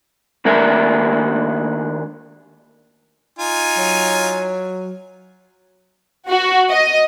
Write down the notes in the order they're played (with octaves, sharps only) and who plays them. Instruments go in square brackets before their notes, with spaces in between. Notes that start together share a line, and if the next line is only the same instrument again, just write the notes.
[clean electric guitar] D#2 A3 A#3 D4 A#4 E5
[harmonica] D#4 F4 G#5
[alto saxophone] F#3
[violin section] F#4
D#5